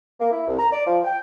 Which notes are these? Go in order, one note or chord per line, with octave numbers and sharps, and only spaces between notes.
A#3
E4
C2
A#5
D5
F3
G5